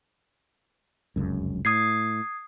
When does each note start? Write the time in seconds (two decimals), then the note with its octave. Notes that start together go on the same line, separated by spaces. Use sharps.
1.16 F1 C#2 F#2
1.65 A2 D#6 G#6 C7